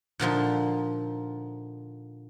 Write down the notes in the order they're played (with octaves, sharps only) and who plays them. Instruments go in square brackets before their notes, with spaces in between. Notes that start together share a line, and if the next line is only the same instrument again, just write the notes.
[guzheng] A#2 D3 F3 D#4